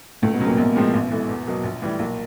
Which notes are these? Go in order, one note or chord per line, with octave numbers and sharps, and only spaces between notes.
C#2 A2 A3
B2 B3
C#3 F#3
A#2 A#3
A#1 B2 B3
G#2 F3 G#3 C4
A1
G#2 E3 A3
E2
B2 F#3 A#3
A#1
A2 E3 G3
B1 A#2 A#3